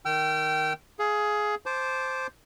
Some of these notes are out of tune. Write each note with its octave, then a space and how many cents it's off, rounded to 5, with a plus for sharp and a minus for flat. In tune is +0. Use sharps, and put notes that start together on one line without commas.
D#3 +0 G5 -20 E6 +45
G#4 +15 F5 -5
C5 +0 A5 -20 D6 +0